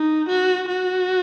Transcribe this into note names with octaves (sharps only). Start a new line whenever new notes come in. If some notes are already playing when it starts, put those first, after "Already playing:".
Already playing: D#4
F#4
F#4